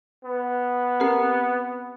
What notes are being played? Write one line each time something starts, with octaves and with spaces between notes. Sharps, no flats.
B3
C4 G4 A#4